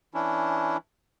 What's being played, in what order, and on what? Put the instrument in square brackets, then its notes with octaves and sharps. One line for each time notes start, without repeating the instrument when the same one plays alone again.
[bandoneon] E3 C#4 D4 E4